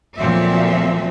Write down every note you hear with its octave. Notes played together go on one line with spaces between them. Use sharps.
D2 A#2 F3 F#3 C4 E5